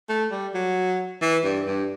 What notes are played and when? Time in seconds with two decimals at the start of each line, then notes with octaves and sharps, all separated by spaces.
0.09 A3
0.31 G3
0.54 F#3
1.22 E3
1.44 G2
1.67 G2